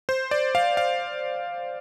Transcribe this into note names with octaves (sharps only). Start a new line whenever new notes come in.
C5
D5
F5
F5